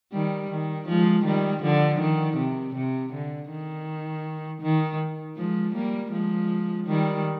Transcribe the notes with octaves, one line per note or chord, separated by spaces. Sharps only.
D#3 G3
D#3
F3 G#3
D#3 G3
D3 F3
D#3
C3
C3
D3
D#3
D#3
F3 G#3
G3 A#3
F3 G#3
D#3 G3